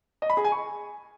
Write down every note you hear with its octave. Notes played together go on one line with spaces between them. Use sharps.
D#5
B5
G#4
G#5
C#6